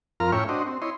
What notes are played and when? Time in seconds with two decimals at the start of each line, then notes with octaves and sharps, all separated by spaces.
0.20 F2 F4 A#4 A#5 F6
0.32 A2 C#4 C#5 E5 G5 C#6
0.49 D4 F#4 C5 D#5
0.67 C4
0.82 E4 C#5 D#5 C6